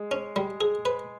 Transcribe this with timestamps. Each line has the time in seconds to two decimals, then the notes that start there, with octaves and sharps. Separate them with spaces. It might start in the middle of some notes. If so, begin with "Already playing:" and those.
Already playing: G#3
0.11 C#4
0.36 G3
0.61 G#4
0.85 B4